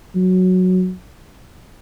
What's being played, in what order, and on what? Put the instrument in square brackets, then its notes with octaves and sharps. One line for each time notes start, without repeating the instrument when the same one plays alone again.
[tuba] F#3